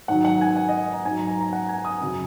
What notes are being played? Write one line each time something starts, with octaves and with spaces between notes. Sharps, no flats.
G#2 D#3 F#3 F#5
F#5
G#5
F#5
D#5
A#5
G#2 F#3 G#5
A#5
A#5
A#5
F#5
G#5
D#6
F#2 C#3 F#3